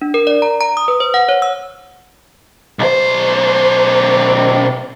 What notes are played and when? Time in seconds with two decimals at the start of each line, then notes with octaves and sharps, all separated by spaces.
0.02 D4
0.14 A#4
0.27 D5
0.42 A#5
0.61 A#5
0.77 D#6
0.88 B4
1.00 C5
1.14 F#5
1.29 C#5
1.42 E6
2.79 B1 C5